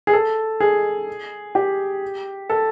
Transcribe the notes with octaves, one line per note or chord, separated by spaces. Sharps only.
G#4
A4
G#4
G4
A4